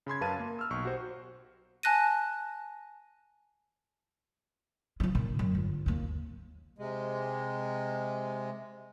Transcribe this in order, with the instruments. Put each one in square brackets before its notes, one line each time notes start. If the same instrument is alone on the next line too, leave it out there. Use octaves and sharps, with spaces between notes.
[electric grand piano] C#3 B5 C6 G#6
F#2 B4 F5 A5 D#7
A#3
E6 F6
B1 C#6
F#4 G4 C5
[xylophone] G#5 A5 F#6 A#6 D#7
[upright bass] F3 G#3
A#2 D3
F#2
G1
D#2 A#3
[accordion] C3 G#3